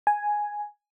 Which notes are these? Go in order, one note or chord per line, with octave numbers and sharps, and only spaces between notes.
G#5